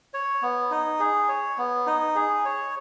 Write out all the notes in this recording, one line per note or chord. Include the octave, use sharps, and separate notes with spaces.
C#5
B3
D#4
G#4
C#5
B3
D#4
G#4
C#5